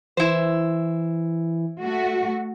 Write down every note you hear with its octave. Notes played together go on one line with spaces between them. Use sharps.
E3 E4 C5
A3 F#4